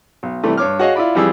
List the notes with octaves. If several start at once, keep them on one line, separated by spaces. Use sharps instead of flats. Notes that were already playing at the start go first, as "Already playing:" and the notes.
B1
C3 E3 G3 A3
G2 C#5 D6 F6
F#4 G#4 C#5 D#5 F5
E4 F4 D5 B5
F2 E3 G3 F4 G#4 E6